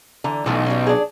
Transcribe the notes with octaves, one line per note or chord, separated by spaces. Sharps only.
D3 E3 A#5
B1 E3 F3 A3
G3 C#4
D4 G#4